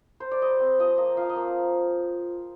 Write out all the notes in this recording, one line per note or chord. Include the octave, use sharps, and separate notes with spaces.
C5
D5
G3 D#5
C4
F3 D#5
A#3 D#5
F3 F5
D#5
A#3